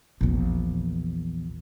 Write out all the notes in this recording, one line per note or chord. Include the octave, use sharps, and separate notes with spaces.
A#1 E2